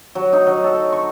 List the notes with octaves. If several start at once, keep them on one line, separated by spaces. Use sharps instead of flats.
F#3
D#4
F#3
A4
C#6